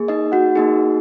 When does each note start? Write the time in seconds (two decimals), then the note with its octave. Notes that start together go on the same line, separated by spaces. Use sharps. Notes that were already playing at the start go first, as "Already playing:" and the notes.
Already playing: A#3 G#4
0.08 D#4 D#5
0.32 F#4 F#5
0.56 A#3 D#4 G#4